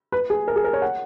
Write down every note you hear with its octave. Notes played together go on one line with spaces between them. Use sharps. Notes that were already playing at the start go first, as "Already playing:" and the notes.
B4
G#4
A#4
G#4
A#4
C#5
F#5